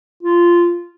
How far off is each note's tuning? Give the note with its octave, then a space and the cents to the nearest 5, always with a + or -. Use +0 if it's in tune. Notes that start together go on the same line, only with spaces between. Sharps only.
F4 -10